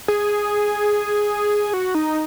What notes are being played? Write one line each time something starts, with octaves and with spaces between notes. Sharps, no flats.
G#4
F#4
D#4